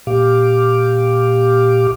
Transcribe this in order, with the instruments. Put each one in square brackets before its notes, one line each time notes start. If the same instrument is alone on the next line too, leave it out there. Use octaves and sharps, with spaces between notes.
[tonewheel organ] A#2 G4 F5 D6